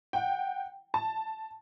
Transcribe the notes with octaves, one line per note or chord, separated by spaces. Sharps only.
F#5 G5
A5